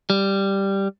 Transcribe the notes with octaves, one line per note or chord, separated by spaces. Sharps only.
G3